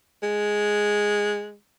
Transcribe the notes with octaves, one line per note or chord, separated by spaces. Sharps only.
G#3